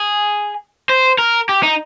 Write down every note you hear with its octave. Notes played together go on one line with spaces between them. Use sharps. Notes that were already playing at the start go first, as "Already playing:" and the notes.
Already playing: G#4
C5
A#4
G4
D#4